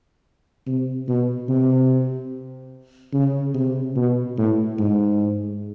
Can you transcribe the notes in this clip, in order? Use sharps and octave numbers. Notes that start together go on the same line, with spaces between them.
C3
B2
C3
C#3
C3
B2
A2
G#2